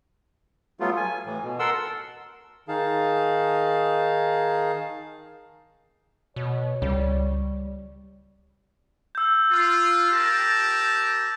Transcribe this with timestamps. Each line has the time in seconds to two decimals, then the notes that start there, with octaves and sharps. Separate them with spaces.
0.80 F#3 G3 A3 B3 F4
0.97 G#5
1.26 A2 E3
1.43 B2
1.59 A4 A#4 F#5 C6 E6
2.68 D#3 D#4 G#4 F5 A5
6.36 B2 C#5
6.82 C#2 G3
9.15 E6 G6
9.51 F4
10.12 G4 A#4 A5